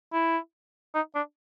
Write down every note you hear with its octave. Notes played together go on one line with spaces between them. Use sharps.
E4
D#4
D4